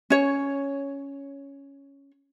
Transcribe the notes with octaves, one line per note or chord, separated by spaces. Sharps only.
C#4 C#5